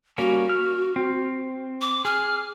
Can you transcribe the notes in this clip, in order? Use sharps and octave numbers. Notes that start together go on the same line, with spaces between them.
G3 A#3 C#4 F#4
F6
C4
D6
G#4 F6